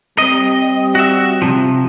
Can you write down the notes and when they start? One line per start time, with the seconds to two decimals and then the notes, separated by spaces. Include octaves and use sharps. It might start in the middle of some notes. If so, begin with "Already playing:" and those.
0.18 G3 C4 D#5
0.95 F#4 E5
1.42 C3 F3